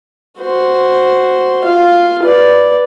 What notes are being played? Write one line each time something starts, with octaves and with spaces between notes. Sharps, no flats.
F#4 C5
F4 F5
B4 D5